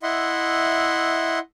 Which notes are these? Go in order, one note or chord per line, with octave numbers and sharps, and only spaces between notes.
E4 D#5 E5 F#5 C6